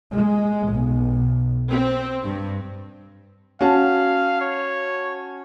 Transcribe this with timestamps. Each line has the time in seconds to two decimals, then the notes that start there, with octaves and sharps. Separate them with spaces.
0.14 G#3
0.70 B1
1.71 C4
2.26 G2
3.61 C#4 F#4 F5 A5
4.41 C#5